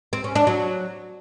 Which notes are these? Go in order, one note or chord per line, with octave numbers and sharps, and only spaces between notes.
C4
C#4
D4
F#3